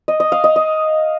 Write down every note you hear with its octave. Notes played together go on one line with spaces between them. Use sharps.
D#5
D#5
F5
D#5
D#5